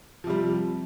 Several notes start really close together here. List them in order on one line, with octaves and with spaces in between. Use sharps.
F3 C3 G3